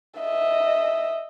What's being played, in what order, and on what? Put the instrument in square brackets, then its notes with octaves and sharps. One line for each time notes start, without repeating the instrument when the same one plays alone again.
[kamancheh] D#5 E5